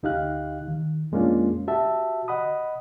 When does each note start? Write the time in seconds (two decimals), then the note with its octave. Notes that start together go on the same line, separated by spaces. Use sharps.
0.03 D2 D#4 G4 F5 F#6
0.68 D#3
1.12 F2 G#3 A#3 C#4 D4 F4
1.68 F#4 G4 E5 A5
2.28 D#5 F#5 B5 D#6